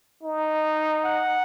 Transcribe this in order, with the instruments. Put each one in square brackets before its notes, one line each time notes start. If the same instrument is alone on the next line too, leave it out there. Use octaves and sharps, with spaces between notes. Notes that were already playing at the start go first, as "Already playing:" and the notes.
[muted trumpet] D#4
[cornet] F#5